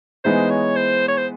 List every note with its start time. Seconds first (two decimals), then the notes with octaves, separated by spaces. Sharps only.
0.24 E3 G#3 B3 D#4 C5
0.50 C#5
0.76 C5
1.08 C#5
1.17 C5